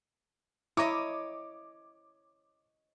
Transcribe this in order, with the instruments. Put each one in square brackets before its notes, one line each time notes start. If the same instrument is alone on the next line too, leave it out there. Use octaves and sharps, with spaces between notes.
[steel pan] E4 A#5 [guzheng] C#5 D#5 [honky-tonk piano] D6